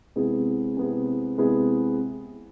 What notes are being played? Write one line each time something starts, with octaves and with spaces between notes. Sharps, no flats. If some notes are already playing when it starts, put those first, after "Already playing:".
C3 G#3 B3 E4 G#4
C3 G#3 B3 E4 G#4
C3 G#3 B3 E4 G#4